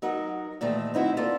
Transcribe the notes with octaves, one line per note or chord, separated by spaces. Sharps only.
F#3 D#4 A#4 F#5
A#2 D#3 E3 A3
C4 D#4 E4 F#4
A#3 F4 A4 B4 D5